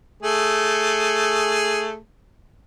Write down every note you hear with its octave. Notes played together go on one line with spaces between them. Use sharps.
A3 G#4